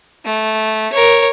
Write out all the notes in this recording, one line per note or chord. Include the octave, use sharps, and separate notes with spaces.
A3
A#4 C#5